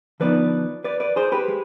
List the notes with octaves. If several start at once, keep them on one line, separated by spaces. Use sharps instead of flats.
D3 F3 B3 D#4 B4 D5
B4 D5
B4 D5
G#4 C5
G4 B4
G#3